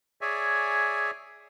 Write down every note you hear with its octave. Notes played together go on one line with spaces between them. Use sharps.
G#4 C#5 D5 E5 G#5